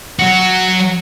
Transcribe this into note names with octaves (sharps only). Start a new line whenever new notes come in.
F#3 F#4